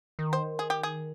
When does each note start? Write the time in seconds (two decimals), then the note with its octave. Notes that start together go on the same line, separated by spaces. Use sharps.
0.19 D#3
0.33 C5
0.59 G#4
0.70 G4
0.83 G#4